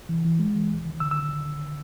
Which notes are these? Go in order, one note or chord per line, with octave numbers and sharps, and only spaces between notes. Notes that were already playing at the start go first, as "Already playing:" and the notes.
E3
E3
G#3
E3
D2
D#3
D3 E6
E6